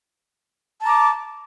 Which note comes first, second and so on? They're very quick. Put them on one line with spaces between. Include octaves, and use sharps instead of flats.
A5 A#5 D6